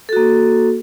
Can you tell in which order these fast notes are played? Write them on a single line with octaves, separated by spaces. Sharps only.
A4 F#4 A#3